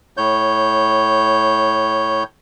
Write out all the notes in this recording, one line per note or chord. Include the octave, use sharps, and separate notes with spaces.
A2 C#5 G6